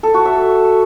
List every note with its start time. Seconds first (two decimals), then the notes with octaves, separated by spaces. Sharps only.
0.03 A4
0.14 F#4
0.25 E5